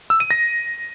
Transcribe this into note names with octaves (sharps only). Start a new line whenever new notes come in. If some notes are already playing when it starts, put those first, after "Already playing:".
E6
D#7
A#6